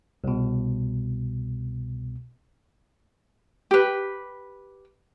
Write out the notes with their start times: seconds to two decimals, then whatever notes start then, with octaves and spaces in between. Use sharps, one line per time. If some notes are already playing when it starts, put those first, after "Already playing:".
0.24 C2 B2
3.71 G4 B4